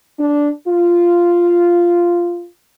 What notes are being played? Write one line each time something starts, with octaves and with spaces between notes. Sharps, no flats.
D4
F4